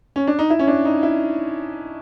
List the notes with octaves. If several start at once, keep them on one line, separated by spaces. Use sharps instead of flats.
C#4
D4
D#4
E4
C#4
D4
D#4
E4